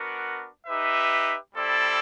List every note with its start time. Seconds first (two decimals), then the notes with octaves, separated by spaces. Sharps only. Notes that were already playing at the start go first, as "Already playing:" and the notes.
Already playing: B3 D4 F#4 A#4
0.66 D#4 G4 B4 E5
1.55 G3 C4 E4 A4 D5